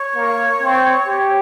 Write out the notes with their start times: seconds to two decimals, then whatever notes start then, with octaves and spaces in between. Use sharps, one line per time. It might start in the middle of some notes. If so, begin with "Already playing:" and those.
Already playing: C#5
0.15 A#3
0.62 C4
1.07 G4